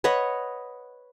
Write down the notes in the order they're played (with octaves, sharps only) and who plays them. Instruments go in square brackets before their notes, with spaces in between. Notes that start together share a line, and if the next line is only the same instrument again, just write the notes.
[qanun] B4 C#5 D#5 F#5